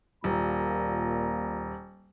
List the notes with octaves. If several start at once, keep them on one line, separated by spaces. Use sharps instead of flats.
D#1 A#2 A#5